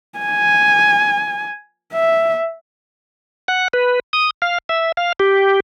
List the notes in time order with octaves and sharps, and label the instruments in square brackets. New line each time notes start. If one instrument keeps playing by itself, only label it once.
[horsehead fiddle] G#5
E5
[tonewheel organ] F#5
B4
D#6
F5
E5
F5
G4